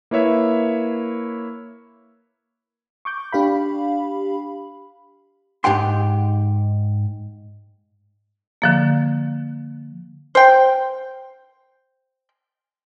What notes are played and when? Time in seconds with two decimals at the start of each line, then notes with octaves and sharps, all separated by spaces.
0.11 A#3 E4 B4 C#5 E5
3.05 C#6 D6 G6
3.32 D4 G4 F5 B5
5.64 G#2 G4 F#5 G5 C6
8.62 D3 F3 A#3
10.35 C5 G5